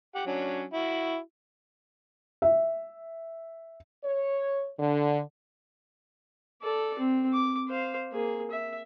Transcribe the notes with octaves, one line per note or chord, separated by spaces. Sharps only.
G4 F#5
F#3 C#4 D4
E4 F#4
E5
C#5
D3
A4 D5
C4
D6
C5 F5
A#3 G#4
E5